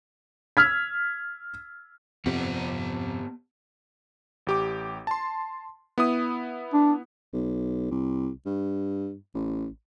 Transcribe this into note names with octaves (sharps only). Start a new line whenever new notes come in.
E6 F6 G#6 B6
F2 C3 B3 G4 F#5
A1 G4 D6
A5 C6
B3 E4 D#6
D4
B1
C2
G2
A1